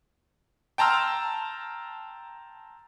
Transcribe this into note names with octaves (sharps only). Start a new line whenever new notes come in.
G5 A5 A#5 C6 E6 F6